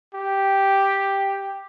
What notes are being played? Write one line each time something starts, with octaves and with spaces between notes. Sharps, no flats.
G4